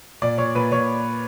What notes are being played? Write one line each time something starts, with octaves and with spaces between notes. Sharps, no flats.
A#2 D5
A#2 C#5
A#2 B4
A#2 C#5